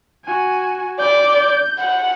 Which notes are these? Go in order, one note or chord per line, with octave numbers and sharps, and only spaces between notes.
F#4 G#5
D5 G6
F#5